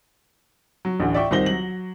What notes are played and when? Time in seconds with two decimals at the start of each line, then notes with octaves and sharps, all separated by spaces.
0.85 F#3
1.00 A1 D2
1.15 D5 E5 G5 C#6
1.31 C2 D#3 C5 A#6 G7
1.46 F#3 F#7